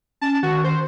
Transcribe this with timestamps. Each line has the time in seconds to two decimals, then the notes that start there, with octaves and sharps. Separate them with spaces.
0.21 C#4 A5
0.43 D#3 F#4
0.64 C5